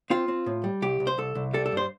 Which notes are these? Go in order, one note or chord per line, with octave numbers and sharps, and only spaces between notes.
C4 F4
C4
A2
G3
C2 G4
C2
C5
C2 A4
C2
G3 A4
A4
G2
C5